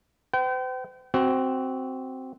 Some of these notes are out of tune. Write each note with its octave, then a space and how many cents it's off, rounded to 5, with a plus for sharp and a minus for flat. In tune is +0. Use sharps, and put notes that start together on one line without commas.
C5 -45 G5 -35
C4 +0 F#4 +20